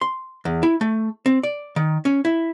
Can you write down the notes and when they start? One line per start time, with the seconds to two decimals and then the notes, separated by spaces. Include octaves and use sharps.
0.01 C6
0.45 E2
0.63 E4
0.81 A3
1.26 C4
1.43 D5
1.76 D#3
2.05 C#4
2.25 E4